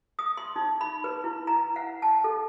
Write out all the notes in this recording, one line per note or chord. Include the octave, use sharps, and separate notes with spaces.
D#6
C6
D#4
B5
B4
E4
A#5
F#5
A5
A4